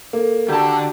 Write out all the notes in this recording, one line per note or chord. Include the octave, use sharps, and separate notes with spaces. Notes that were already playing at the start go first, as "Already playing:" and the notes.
A#3 A4 A#4
D3 F#4 G4 A5 A#5 G6